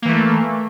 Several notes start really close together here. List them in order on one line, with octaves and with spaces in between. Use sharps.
A#3 E3 A3